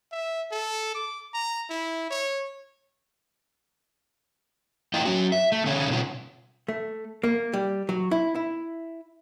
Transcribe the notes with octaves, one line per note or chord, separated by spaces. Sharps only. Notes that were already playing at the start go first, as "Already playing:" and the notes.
E5
A4
D6
A#5
E4
C#5
A3 E4 F4 D#5 G5
F#3 C#4 F#4
E5
A3
D3 C#4 A4 C#5
B2 C#4 F4
A3
A#3
G3
F#3
E4
E4